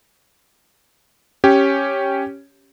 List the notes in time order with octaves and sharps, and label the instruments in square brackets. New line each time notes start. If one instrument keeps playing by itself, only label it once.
[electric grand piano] C#4 G4 C#5